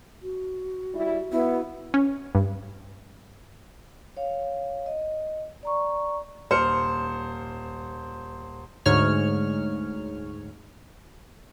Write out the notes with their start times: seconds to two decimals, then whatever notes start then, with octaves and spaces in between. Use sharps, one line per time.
0.22 F#4
0.94 G3 E4
1.32 B3 E4
1.94 C#4
2.35 G2
4.17 C#5 F5
4.86 D#5
5.63 D5 A#5 C#6
6.51 D#1 C5 F6 C#7
8.86 D2 G#2 C#5 F6